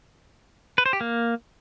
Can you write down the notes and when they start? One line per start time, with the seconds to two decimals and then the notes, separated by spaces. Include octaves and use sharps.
0.78 B4
0.86 C5
0.93 G4
1.01 A#3